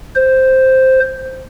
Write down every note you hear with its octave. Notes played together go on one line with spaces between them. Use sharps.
C5